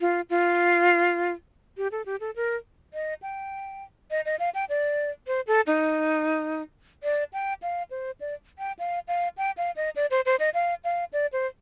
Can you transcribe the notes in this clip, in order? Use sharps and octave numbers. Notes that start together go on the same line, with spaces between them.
F4
F4
G4
A4
G4
A4
A#4
D#5
G5
D#5
D#5
F5
G5
D5
C5
A4
D#4
D5
G5
F5
C5
D5
G5
F5
F5
G5
F5
D#5
D5
C5
C5
D#5
F5
F5
D5
C5